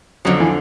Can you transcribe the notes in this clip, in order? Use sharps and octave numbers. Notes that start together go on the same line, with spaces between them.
F2 D3 F3 F#3
E3